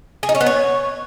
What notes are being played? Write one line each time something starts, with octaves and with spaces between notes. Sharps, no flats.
G#4
D#4
C#4
B3
C#5